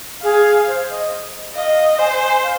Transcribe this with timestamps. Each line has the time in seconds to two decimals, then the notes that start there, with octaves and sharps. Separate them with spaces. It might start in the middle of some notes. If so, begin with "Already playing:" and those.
0.22 G#4 F5
0.67 C5
0.89 D#5
1.55 D#5 F5
1.99 C5 G#5
2.43 F5